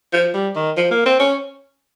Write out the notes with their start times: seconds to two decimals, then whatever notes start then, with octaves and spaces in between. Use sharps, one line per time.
0.13 F3
0.34 G3
0.56 D#3
0.77 F3
0.91 A#3
1.06 C4
1.19 C#4